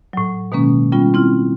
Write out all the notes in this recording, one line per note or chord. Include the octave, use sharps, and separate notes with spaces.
A2 F#3
B2 D#3 G#3 A#3 C#4
G3 B3 C#4 F4
C4 E4 F6